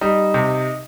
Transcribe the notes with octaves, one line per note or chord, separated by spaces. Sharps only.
G3 D#4
C3